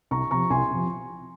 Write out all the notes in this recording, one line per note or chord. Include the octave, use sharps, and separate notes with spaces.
C2 A#5 C#6
C3 F3 A#5 C#6
C2 G#5 C6
C3 F3